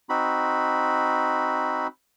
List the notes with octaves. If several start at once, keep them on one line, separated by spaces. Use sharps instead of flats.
C4 D#4 F#4 B5